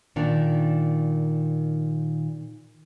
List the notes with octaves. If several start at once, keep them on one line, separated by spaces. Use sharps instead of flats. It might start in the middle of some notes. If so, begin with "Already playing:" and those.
A#2 D#3 D4